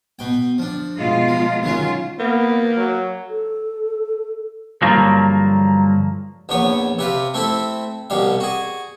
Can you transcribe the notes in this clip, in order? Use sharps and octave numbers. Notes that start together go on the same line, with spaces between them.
B2 G5
F3 D4
B2 G#3 F4
F3
D#3 F#3 C#4 F4
A#3 B3
F#3
A4
G2 D3 F3 F#3 A#3
A#1 E2 B3 C#5
C3 B4 F5
A3 C4 E4 A4
C2 B2 G3 F5
F#4 G#4